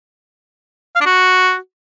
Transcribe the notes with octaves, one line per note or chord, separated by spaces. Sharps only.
F5
D4
F#4